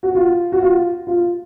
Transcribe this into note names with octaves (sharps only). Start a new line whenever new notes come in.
F#4
F4
F#4
F4
F4